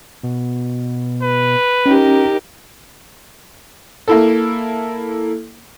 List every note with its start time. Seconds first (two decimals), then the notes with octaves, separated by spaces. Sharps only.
0.23 B2
1.22 B4
1.86 C#4 D#4 G4 A#4
4.08 A#3 E4 A4